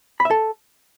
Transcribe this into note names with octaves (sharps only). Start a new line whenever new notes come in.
B5
E5
A4